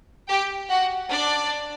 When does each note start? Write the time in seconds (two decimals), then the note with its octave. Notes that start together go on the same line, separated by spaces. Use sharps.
0.29 G4 G5
0.69 F#4 F#5
1.11 D4 D5